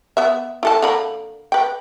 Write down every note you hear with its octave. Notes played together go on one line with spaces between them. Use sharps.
B3 E5
E4 A4 A5
D3 A#3 B5
B4 G5